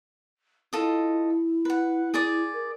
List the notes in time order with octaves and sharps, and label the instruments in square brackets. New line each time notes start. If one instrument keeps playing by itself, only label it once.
[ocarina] E4 [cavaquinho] F4 A4 D#5
[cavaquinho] B4 F#5
G#4 D5 D#6
[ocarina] A#4